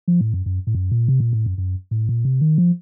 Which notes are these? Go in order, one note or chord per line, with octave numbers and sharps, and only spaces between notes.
F3
A2
F#2
F#2
A2
F#2
A#2
C3
A#2
A2
F#2
F#2
A2
A#2
C3
D#3
F3